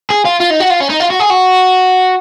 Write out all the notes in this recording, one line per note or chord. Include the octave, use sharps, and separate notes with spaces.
G#4
F4
F4
D#4
F#4
F4
C#4
D#4
F4
F#4
G#4
F#4